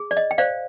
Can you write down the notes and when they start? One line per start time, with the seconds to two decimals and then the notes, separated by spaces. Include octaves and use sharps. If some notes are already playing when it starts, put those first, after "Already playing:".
Already playing: G#4
0.11 D5
0.17 D#5
0.31 G5
0.38 C5 D5 F5